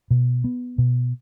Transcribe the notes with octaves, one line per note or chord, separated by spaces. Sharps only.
B2
B3
B2